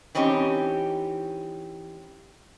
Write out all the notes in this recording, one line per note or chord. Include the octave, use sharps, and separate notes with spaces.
E3 C4 C#4 D#4 G4